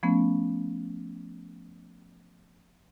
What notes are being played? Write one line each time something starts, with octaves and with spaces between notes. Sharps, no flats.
F3 A3 B3 C#4